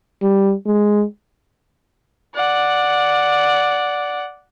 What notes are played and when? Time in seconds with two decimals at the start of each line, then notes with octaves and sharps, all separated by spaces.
0.22 G3
0.66 G#3
2.35 D5 F#5